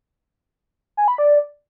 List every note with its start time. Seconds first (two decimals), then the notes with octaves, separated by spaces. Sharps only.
0.97 G#5
1.08 B5
1.18 D5